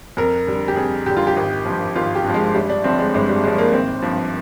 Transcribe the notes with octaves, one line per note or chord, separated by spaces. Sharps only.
F2 A#4
D3 G3
G4
F2 G#4
D3 G3 G4
F4
G4
G#1
G2 F3
G#1 F4
G4
G2
F3 G#3
G1 G3
D4
G2 D3 F3 C4
G#3
G1 G#3
G3
G2 D3 F3 G#3
A#3
G#1 C4
G2 F3